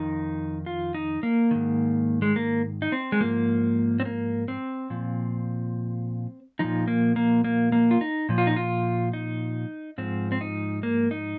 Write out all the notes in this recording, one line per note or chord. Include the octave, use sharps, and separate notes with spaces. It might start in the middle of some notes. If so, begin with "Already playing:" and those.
Already playing: F2 D#3 D#4
F4
D#4
A#3
G#2 D#3
G#3
A#3
D#4
C4
G#3
G#2 F3 A#3
C4
A#3
C4
A#2 F3
A#2 F3 D#4
A#3
A#3
A#3
A#3
F4
D#4
A#2 F3
F4
D#4
F4
D#4
G#2 F3 C4
C4
D#4
A#3
D#4